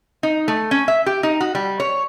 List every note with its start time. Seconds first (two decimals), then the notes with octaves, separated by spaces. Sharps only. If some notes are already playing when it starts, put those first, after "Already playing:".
0.23 D#4
0.48 A3
0.71 C#4
0.88 E5
1.06 G4
1.23 D#4
1.41 F#4
1.55 G3
1.80 C#5